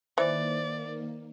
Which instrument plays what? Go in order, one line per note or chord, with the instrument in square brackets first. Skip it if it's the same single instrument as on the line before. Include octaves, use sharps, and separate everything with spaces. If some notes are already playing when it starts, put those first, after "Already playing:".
[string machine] D#3 A#3 [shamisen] E3 [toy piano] C5 [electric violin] D5